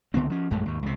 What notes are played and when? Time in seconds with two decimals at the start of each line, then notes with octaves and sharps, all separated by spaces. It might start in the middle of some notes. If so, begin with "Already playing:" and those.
0.14 C#2 D3 B3 C4
0.30 F3 C#4
0.50 A#1 F#2 G#3 A3
0.65 D#2 G#2
0.83 C#2 C3